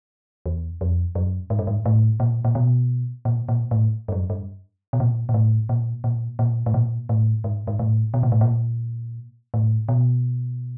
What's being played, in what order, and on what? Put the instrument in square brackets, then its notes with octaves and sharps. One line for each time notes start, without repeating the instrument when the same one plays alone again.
[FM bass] E2
F2
F#2
G#2
G2
G#2
A2
A#2
A#2
B2
A#2
A#2
A2
G2
F#2
G2
B2
A#2
A#2
A2
A#2
A#2
A#2
A2
A#2
A2
G#2
G#2
A2
B2
A#2
A2
A#2
A2
B2